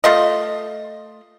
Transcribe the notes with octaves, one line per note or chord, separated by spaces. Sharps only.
A3 F4 D#5